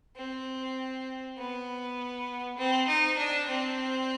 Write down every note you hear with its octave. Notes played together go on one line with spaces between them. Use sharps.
C4
B3
C4
D#4
D4
C4